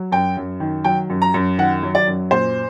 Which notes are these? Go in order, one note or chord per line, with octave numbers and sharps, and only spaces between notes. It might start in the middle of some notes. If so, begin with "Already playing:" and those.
Already playing: F#3
F#2 G5
F#2
D#3
F#3 G5
F#2
A#5
F#2
D#3 F#5
F#3
D5
F#2
A#2 C5